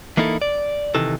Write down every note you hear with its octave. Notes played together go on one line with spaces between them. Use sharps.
E3 A#3 D#4 E4 A4
D5
C3 D#3 E3 A4